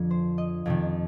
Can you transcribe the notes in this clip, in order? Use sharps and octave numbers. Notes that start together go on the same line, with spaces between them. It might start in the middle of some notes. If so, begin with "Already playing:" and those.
Already playing: F2 D3 F3 D4
C5
D#5
F2 C3 D#3